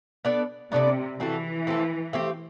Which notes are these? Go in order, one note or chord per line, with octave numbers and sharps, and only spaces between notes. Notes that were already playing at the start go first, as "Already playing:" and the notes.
B3 D4 A4 D5
C3 B3 D4 A4 D5
E3 A3 C4 F#4 A4
A3 C4 F#4 A4
A3 C4 G4